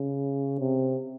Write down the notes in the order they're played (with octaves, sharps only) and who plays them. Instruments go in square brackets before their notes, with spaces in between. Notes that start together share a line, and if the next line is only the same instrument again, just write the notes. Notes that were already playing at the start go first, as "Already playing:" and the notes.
Already playing: [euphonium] C#3
C3